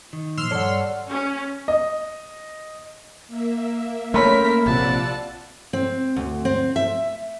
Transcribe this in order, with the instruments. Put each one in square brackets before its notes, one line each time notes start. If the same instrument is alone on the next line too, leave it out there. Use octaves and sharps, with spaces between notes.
[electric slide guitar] D#3
[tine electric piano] A#2 F3 [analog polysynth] C6 E6 F6
[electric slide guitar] G2 A4 [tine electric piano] C#5 D5 F#5
[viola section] C#4
[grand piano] D#5
[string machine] A#3 E5
[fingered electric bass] A3 C4 C#4 [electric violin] A#4 B6 [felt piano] C#5 B5 C6
[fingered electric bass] A#1 C3 F3 [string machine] F4 D5 E6 [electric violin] F#5 A5
[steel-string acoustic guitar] C4
D2
C4
E5